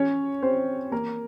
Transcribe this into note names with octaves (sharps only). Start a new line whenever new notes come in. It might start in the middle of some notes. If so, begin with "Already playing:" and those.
Already playing: C#4 C#5
C4 C5
A#3 A#4